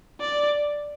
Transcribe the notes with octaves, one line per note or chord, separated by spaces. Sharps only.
D5